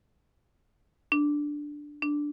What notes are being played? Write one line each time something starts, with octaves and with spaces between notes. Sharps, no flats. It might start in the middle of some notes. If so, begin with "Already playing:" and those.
D4
D4